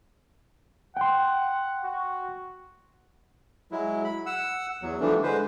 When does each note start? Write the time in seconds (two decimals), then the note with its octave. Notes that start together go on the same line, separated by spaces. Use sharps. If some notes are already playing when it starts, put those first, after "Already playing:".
0.97 F#5 G5 C6
1.84 F#4
3.71 F#3 G#3 E4
4.04 B5
4.26 F#5 E6
4.82 E2 F#3
5.00 D3 E3 F3 G3 A3 D4
5.23 D3 G#3 B4 C5